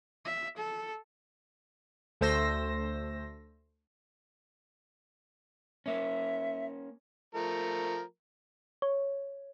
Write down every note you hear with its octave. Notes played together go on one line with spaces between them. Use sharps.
E5
A4
D2 A3 C5 E6 A#6
A#3 C#4 E5
F3 A3 A#4
C#5